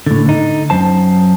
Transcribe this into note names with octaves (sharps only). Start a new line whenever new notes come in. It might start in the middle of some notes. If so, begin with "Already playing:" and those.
A2 D3
D3 D#4
F#2 C5 A5